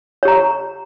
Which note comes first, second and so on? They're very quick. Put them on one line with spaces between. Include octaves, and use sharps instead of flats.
C#5 G4 A#5